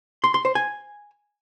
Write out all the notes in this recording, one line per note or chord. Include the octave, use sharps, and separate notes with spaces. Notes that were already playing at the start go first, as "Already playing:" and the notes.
C6
C6
C5
G#5